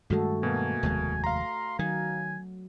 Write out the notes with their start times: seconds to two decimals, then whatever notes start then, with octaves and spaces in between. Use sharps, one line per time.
0.10 G2 D#3 G#3 A3 F#4 A4
0.43 B2 A#3 G#5
0.83 F1 D#2 G#3
1.24 F5 A#5 C6
1.79 D#3 F#3 G#5